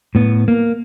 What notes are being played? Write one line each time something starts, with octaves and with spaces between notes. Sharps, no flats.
A2 B3
A#3